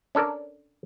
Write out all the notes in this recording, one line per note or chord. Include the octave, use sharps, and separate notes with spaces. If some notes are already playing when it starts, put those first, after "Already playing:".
C#4 D4 A4 A#4 D5